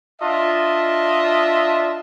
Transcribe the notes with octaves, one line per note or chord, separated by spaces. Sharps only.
D4 F4 D#5 E5 A5